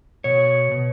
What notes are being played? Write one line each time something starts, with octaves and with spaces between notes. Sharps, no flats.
B2 C#5
B2